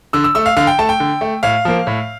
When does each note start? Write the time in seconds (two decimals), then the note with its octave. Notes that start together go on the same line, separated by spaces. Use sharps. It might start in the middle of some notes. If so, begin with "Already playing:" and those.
0.13 D3 E6
0.24 E6
0.35 A3 E6
0.46 F5
0.56 D3 F5
0.67 G5
0.79 A3 A5
0.89 G5
1.00 D3
1.21 A3
1.43 A2 F5
1.65 F3 A#3
1.87 A2